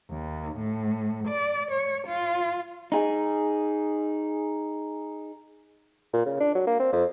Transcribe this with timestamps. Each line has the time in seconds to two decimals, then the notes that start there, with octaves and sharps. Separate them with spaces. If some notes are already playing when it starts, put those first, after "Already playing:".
0.10 D#2
0.58 A2
1.28 D5
1.71 C#5
2.08 F4
2.92 D#4 G#4
6.13 A#2
6.26 C#3
6.40 D4
6.55 F#3
6.67 A#3
6.80 C4
6.93 F2